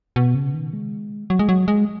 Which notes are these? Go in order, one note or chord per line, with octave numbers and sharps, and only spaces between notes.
B2
C#3
D#3
G#3
F#3
G#3
F#3
G#3